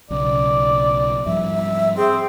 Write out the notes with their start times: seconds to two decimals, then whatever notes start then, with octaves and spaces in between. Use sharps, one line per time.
0.11 B1 C#3 D5
1.26 G#2 F3 G3 E5
1.97 C4 G#4